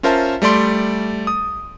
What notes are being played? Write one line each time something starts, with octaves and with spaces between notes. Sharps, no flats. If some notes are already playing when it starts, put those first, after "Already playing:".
C#4 F4 A#4 C5 E5 A5
G3 A3 D5 C6 D7
D#6